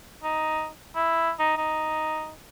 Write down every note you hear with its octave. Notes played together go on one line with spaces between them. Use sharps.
D#4
E4
D#4
D#4